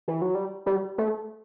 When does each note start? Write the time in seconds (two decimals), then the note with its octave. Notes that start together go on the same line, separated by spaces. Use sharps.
0.08 E3
0.22 F#3
0.35 G3
0.66 G3
0.98 A3